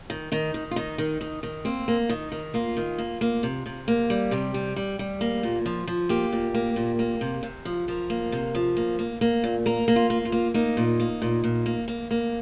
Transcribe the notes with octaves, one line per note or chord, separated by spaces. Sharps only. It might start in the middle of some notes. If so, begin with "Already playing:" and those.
D#3
D#3 D#4
D#3
F4
D#3 D#4
D#3
D#3
D#3
A#3 C4
A#3
D#3 D#4
D#3
A#3 F4
D#3
A#3
A#3
C3
C3
A#3
G3
C3 G4
G3
G3
G3
A#3
A#2
F3
F3
A#3 G4
A#2
A#3
A#2
A#3
C3
C3
F3
F3 A#4
A#3
C3
F3
A#3
A#3
A#3
A#2
A#3 A#4
A#3
F4
A#3
F4
A#3
A#3 D#4
A#2
A#3
A#2
A#2
A#3
A#3
A#3